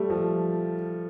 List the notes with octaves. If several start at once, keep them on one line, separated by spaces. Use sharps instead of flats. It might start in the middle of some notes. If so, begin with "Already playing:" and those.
Already playing: G3 A3
F3